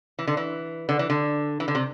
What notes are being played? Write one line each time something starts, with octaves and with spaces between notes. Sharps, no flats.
E3
D3
E3
D3
E3
D3
E3
D3
C3